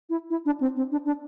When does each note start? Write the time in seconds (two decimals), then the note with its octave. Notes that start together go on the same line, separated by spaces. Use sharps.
0.10 E4
0.30 E4
0.46 D4
0.61 C4
0.76 C4
0.91 D4
1.06 D4